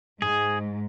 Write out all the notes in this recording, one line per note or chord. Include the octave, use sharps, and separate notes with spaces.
G#2 G#4